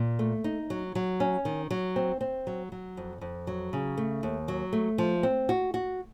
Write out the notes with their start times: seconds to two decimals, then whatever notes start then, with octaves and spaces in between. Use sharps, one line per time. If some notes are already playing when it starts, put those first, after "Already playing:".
Already playing: A#2
0.19 A3
0.44 D#4
0.70 F#3
0.95 F#3
1.20 C#4
1.45 D#3
1.71 F#3
1.96 C4
2.21 C4
2.47 F#3
2.72 F#3
2.97 F2
3.21 F2
3.47 F#3
3.73 C#3
3.97 A3
4.23 D#2
4.48 F#3
4.73 A3
4.98 F3
5.23 C4
5.49 F#4
5.74 F#4